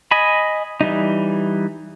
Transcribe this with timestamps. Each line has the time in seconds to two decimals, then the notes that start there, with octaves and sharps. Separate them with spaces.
0.11 D#5 G#5 B5
0.81 E3 G3 D#4